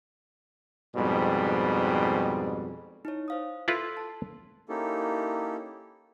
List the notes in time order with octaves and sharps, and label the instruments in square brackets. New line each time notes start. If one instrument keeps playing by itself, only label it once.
[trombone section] F2 G#2 B2 G3
[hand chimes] D#4 E4 C#5
C5 F5 D#6
[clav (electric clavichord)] E4 F4 B4 [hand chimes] A4 C6 E6
[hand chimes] A5
[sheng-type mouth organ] A#3 C#4 D#4 E4 G4 A4